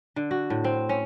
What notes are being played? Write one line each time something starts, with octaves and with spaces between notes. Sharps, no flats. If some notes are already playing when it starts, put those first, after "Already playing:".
D3
F#4
A2
C4
C#4